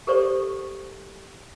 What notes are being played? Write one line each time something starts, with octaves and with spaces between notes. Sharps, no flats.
G4 A4 A#4 C5 D5 C#6